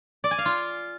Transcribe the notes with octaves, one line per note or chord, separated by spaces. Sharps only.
D5
G#5
F5
F4